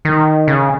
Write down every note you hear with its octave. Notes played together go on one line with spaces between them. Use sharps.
D#3
C#3